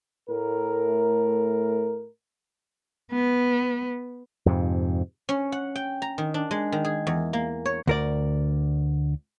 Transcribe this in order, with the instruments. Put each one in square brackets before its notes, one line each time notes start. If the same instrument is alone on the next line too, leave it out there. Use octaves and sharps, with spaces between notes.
[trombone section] A2 A3 A#4
[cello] B3
[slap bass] F2 G#2 C3
[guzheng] C#4
F#5
G5
A#5
D#3
D4
G#3
D#3
G#4
E2
A#3
C#5
[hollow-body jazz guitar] D2 A#4 D5